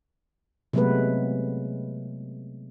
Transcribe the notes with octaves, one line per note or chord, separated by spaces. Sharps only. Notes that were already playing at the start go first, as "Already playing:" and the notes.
C3 F#3 G#3 A3 B3 B4